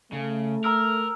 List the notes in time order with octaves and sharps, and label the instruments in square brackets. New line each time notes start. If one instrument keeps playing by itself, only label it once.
[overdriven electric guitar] C#3 [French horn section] A3
[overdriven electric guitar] A#4 [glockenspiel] A#5 E6 F6